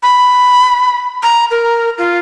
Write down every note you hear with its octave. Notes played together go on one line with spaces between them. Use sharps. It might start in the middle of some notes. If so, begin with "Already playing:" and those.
B5
A#5
A#4
F4